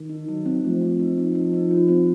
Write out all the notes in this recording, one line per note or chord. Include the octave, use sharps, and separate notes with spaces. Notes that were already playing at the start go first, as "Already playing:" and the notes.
Already playing: D#3
D#4
F#3 D#4
C4
F3 A3
C4
D#4
C4
D#4
D#4
F4
C4